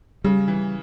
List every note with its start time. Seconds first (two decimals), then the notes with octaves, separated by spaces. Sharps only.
0.24 C#3 G3
0.48 E3